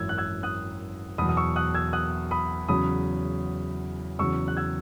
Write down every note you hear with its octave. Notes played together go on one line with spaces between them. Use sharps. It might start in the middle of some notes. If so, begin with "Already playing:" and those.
Already playing: G#1 F#2 E3 E6 G#6
F#6
E6 G#6
D#6 F#6
E2 B2 F#3 B5 D#6
D#6
C#6 E6
D#6 F#6
E6 G#6
D#6 F#6
B5 D#6
E2 C#3 F#3 B5 D#6
E2 C#3 F#3 C#6 E6
F#6
E6 G#6